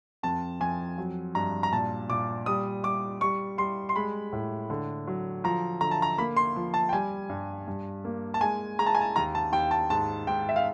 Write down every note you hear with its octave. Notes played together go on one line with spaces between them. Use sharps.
F2 A5
F2 G#5
F#3
G2 A#5
A#5
A#2 A5
A#2 D6
G3 D#6
G3 D6
G3 C#6
G3 C6
C6
G#3 B5
A2
D3
F#3
F3 A#5
D3 A#5
A5
A#5
A#3 B5
C6
F3
A5
G5
G3 G#5
G2
G2
A#3
A5
G#3 G#5
G#3 A#5
A5
G#5
A5
D#2 A#5
A5
D#2 G5
A5
G#2 A5
G#2 G5
E5
F5